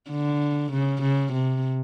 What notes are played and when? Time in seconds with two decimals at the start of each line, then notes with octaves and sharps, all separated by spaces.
0.10 D3
0.72 C#3
1.02 C#3
1.32 C3